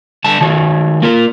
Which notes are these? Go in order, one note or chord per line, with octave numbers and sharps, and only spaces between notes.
D3 G3 A5
D#3 F#4 C#5
A#3 F4 A#4